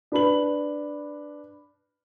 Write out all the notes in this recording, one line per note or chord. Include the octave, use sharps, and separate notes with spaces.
D4 B4 B5 F#7